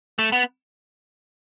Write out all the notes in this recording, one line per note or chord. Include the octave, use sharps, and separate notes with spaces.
A3
B3